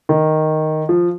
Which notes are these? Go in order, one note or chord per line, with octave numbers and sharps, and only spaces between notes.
D#3
F3